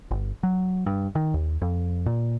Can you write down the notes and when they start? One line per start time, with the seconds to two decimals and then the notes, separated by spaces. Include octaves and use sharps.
0.11 G1
0.43 F#3
0.86 G2
1.15 D#3
1.34 D#2
1.62 F2
2.06 A#2